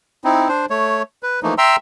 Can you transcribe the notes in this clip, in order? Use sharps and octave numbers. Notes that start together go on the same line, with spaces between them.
C4 D#4 E4
D4 C5
A3 C#5
B4
E3 F3 A3 A#3 D#4
E5 G5 A#5 C6 E6